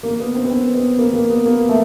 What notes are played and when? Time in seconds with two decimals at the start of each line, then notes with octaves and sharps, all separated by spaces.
0.03 A#3
0.20 B3
0.35 C4
0.45 B3
0.50 C4
0.75 B3
0.98 A#3
1.13 A#3
1.30 B3
1.45 A#3
1.69 A3